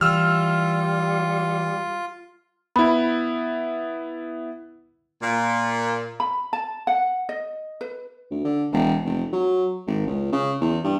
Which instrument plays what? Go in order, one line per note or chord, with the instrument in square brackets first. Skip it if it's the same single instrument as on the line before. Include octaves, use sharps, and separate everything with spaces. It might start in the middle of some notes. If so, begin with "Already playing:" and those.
[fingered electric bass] E3 [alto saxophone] G3 [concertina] F4 [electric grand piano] E6 F6
[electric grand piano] B3 E4 [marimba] B5
[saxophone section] A#2
[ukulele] B5
A5
F#5
D#5
B4
[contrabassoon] D2
D3
E1
F1
F#3
G#1
C#2
C#3
E2
G2